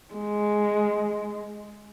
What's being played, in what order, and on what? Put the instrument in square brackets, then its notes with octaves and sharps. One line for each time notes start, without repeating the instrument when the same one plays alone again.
[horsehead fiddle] G#3